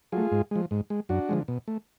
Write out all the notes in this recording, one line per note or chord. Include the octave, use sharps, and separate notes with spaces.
F#3 A3 F4 G#4
G#2
F3 G#3
G#2
G#3
F#2 D4 F#4
D3 F3 G#3
B2
A3